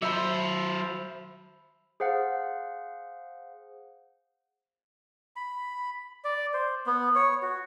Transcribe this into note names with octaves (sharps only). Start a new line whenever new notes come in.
F#3 C5 E5 B5
G#4 C5 F5 F#5
B5
D5
C5
B3
C#5
F#4